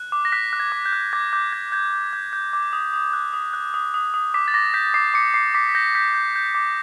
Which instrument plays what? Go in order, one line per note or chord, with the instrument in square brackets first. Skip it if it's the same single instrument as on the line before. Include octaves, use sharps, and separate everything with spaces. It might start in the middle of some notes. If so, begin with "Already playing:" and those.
Already playing: [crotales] F#6
D6
A#6
F#6 B6
F#6
G#6
D6
G6
F#6
D6 G#6
D6 G6
G6 G#6
G6 G#6
G6
G6
G6
D6
D#6
D#6
F#6
D#6
F#6
D#6
D#6
D#6
D6 B6
A6
D6 A#6
G6 B6
D6 C7
D6 C#7
D6 C7
D6 B6
B6
G6 A#6
G6 B6
G6
G6
D6